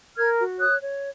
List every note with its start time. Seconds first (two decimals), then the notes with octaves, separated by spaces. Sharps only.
0.15 A#4 F6 G#6
0.38 F#4
0.60 C#5 D#6 F#6
0.82 C#5